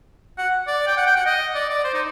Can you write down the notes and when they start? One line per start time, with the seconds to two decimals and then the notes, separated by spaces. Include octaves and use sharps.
0.38 F#5
0.67 D5
0.87 G5
0.97 F#5
1.06 G5
1.16 F#5
1.26 D#5
1.55 D5
1.70 D5
1.84 C5
1.94 D#4